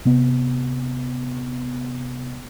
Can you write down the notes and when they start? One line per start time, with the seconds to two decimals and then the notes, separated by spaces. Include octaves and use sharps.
0.05 C3 B3